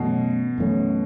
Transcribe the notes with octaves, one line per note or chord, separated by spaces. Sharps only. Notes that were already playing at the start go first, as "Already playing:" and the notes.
Already playing: F#2 B2 E3 A3 C#4
F#2 E3 A3 C#4